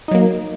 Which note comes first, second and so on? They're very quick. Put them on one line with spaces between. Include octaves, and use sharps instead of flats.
D#4 F#3 A#3